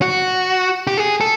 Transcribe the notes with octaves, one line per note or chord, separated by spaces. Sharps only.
F#4
G4
G#4
A4